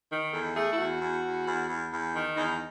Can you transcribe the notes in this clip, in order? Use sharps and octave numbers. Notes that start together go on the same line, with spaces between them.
D#3
E2 A4
A3 G#4
E4
E2 F#4
E2
E2
E2
E2
E2
D#3
E2 D#4